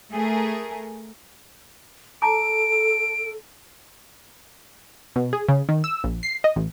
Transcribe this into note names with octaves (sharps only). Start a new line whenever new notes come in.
A3 G#4 A#4
A4 A5 A#5 D6 D7
B2
G#4
C#3
D#3
E6
A#1
C7
D#5
A1